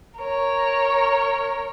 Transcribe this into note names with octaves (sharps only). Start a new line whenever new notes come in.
A#4 C#5